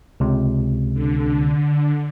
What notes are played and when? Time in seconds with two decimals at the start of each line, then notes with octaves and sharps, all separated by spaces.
0.20 C#2 C3
0.93 D3